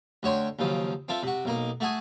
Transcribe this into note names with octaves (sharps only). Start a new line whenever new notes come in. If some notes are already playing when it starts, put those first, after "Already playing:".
D2 F#4 C#5 G5 C6
D#2 C#3 F3 F#3
C4 F4 A4 E5
C3 F#4
B1 A#3 D#4
A3 F#4 G#4 G#5